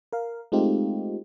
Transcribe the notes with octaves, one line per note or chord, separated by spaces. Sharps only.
A#4 F5
G#3 A3 C4 D#4 F4 G4